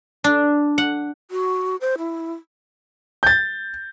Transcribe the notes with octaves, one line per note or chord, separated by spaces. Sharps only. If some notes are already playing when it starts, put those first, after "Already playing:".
D4
F#5
F#4
C5
E4
G6 A6